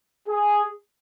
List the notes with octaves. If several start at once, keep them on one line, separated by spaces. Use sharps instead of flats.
G#4